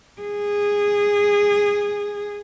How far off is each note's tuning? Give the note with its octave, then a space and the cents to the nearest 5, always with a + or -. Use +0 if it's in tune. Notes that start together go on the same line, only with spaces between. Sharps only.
G#4 -15